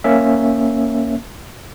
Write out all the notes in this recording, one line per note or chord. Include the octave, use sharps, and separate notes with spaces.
A#3 C#4 E5